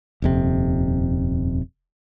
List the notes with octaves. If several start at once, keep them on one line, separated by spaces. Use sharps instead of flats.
D#1 F2 C3